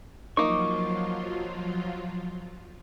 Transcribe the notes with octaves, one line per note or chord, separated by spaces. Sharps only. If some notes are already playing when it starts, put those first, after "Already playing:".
F3 F#3 A#3 D#4 F4 C#6 D6